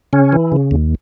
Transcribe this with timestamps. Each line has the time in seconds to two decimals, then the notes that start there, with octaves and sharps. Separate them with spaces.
0.13 C#3 C#4
0.32 E3
0.52 C#3
0.71 D#2